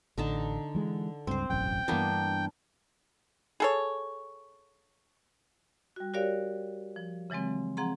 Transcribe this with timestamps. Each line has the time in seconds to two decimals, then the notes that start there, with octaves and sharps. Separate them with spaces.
0.18 A1 D3 D#4 A5
0.75 E3 G#3
1.27 C#2 G2 C4 C5
1.50 E1 A1 F#2 G5
1.88 G2 E3 A#3 B3 D4
3.60 G#4 A4 C#5
5.96 G3 F#4
6.14 F#4 G4 A#4 C#5 D5 F5
6.96 F3
7.30 C#3 E3 F#3 G#3 C4
7.77 F3 C4 G#4 F#5 A#5 C6